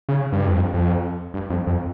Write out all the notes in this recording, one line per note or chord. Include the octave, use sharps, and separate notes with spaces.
C#3
G2
F2
F2
G2
F2
F2